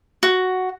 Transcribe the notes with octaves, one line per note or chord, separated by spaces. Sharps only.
F#4